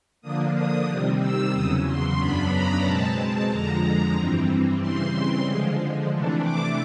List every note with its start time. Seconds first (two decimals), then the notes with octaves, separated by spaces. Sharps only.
0.21 D3 F3 A#3 D4 D#6
0.55 D#6
0.86 C3 D#3 G3 C4
1.19 E6
1.52 E2 C#3 F#3 D#6
1.85 C6
2.18 F#2 C#3 F#3 B3 D4 B5
2.50 A#5
2.83 B2 G#3 C4 A5
3.48 F2 D3 F3 G#3 A#5
4.14 G2 E3 G3 C4
4.80 C#3 E3 G3 C4 C6
5.45 D3 F3 G#3
6.10 C3 E3 A3 D4
6.43 D6